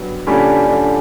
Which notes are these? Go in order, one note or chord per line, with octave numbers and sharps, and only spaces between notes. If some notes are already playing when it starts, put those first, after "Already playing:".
Already playing: G2 F#3 B3
A#2 D3 G3 C#4 G4
D3